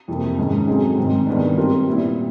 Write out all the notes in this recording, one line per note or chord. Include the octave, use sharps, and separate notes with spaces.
F2 C3 F3 A#3
G#2 D#3 G#3 C#4
F#3 A3 C4 D#4 G#4
G#2 D#3 G#3 C4
G2 D#3 G#3 B3 D4
G3 C4 F4 A#4
A#2 G3 B3 E4